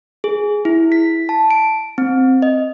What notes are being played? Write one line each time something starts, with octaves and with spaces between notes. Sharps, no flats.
G#4
E4
B6
A5
D7
C4
D#5